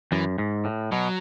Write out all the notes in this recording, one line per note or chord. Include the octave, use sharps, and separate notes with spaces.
F#2 E3
G#2
A2
B2 F#3